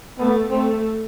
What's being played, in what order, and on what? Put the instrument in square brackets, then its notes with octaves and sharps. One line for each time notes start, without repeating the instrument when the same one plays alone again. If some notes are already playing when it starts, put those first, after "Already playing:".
[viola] A3 [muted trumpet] B3
[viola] A3 [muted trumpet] C4